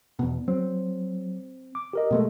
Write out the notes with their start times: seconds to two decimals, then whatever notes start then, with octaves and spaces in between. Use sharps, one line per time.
0.19 E2 B2
0.48 F#3 C4
1.75 D6
1.93 G4 A#4 D#5
2.11 B2 G#3 A3